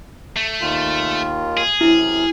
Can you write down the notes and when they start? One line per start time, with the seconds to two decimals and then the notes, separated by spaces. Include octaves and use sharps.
0.36 A3
0.61 D#2 D#3 F4
1.57 G#4
1.81 F#2 C3 E4 F6